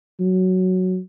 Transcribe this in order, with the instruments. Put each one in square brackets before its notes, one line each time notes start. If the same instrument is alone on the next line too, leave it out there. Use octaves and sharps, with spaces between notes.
[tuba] F#3